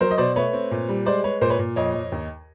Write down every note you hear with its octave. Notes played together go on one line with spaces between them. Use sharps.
F#3 A#4 C5
D#5
B2 C5 D5
A3 B4 C#5
C4
A#2
G3
G#3 C5 D5
G#3 B4 C#5
A#2 A#4 C5
B4 C#5
A#2
F2 C#5 D#5
F2
D#2